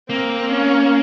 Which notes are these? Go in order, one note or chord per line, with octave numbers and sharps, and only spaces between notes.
A#3 C4
C#4